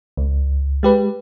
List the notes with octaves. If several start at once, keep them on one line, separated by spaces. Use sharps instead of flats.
C#2
G#3 G4 B4